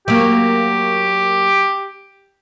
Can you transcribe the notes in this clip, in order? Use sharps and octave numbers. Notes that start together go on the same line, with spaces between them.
F#3 A#3 G4